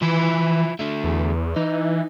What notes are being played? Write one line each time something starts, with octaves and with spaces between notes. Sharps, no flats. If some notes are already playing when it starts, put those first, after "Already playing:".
E3 F3 E4
D3 A3
E2
E3 D#4